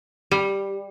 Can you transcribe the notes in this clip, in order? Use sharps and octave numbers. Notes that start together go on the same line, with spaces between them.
G3